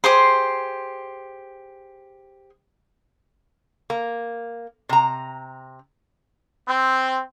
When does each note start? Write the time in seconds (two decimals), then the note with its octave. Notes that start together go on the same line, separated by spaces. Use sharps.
0.04 G4 G#4 C5 C6
3.90 A#3
4.89 C3 A#5
6.68 C4